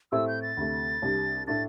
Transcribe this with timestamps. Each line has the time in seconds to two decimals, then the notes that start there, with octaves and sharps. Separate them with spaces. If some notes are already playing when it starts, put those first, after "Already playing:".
0.12 A2 A3 C4 E4 G4 E6
0.28 G6
0.42 A6
0.57 D2 C3 A3
1.02 C2 C3 G3 D4
1.47 A2 A3 D4 A6